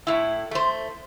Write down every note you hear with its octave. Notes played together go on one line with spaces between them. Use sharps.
A2 E4
A3 C5